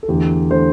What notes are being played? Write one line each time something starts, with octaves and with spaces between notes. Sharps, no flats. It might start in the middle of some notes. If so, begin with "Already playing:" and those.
A4
E2 D3 A3 G4
D3 A3 C5